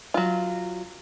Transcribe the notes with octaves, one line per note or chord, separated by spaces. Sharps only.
F#3 F4